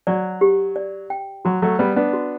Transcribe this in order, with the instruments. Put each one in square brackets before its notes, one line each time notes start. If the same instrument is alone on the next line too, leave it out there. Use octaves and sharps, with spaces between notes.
[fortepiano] F#3 [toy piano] D5
[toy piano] G4
D5
G5
[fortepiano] F#3 [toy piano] F#4
[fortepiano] F#3 A3
[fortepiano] G3 B3 [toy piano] D5
[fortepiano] B3 D4
[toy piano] F#4